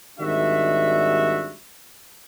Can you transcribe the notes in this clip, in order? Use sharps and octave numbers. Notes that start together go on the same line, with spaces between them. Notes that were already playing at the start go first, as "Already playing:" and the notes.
G#1 D#3 G3 D4 F#4 E5